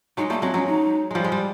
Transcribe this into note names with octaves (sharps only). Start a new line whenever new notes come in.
F#3 G#3 D#4
G3 A3 A#3
F#3 G#3 C4
F#3 G#3 C#4
D#4
F3 G3 G#3
G#3
G3